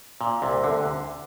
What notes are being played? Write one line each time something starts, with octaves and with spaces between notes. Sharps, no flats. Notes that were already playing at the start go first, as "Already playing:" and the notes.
A#2
C2 C3
D2 D3